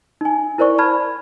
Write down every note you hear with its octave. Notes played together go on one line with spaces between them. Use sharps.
D#4 G#5
E4 A#4 C5 D5 C#6
A5 B5 F6 G#6